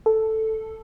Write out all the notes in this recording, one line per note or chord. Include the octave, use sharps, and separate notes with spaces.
A4